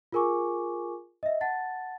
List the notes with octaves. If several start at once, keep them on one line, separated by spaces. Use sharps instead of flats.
F4 G#4 A#4 G#5 C#6 D6
D#5 E5
F#5 A5 A6